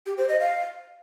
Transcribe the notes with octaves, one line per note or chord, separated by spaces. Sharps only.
G4
C5
D#5
F5